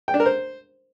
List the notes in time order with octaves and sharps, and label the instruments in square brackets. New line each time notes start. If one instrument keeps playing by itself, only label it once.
[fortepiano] G5
D4
A#4
C5